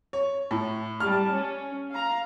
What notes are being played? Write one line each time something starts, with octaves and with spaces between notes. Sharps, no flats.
C#5
A2
G3 A5 F6
C#4
F5 A#5